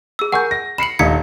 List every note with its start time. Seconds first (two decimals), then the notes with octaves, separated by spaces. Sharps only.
0.19 G#4 E6
0.32 A#4 F#5 G#5 C#6 G6
0.51 A#6
0.78 B5 C7 C#7 E7 F#7
0.99 D#1 D#4 D#6 G#6 B6 C#7